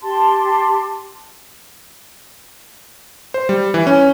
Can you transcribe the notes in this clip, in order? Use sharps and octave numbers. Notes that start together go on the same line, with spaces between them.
G4 A5 C6
C5
G3
E3
C#4